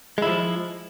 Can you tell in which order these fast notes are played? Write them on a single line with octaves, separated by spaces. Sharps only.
G#3 E4 F3